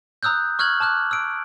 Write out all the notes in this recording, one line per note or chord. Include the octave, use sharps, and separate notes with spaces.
A#5 D#6 E6 F#6 G6
C#6 F6 F#6 G#6 F#7
A5 D6 F6 F#6
E6 D7